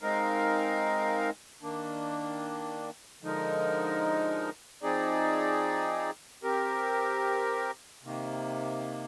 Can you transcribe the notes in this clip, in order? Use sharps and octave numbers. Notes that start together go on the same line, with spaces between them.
G#3 C4 D#4 A#4 F5
D#3 A#3 D4
D3 F3 G#3 D#4 A#4
F3 C4 D#4 G#4 D5
C4 G4 A#4
C3 D#3 A#3